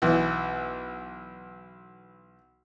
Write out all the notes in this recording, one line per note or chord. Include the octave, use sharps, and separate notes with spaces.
B1 E3